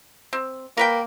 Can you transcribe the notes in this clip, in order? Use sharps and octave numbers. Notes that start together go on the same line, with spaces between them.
C4
A#3 A#4 B4 G5